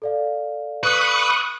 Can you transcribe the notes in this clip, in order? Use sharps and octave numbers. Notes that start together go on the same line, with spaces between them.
A4 D5 F5
B4 C#6 D#6 F#6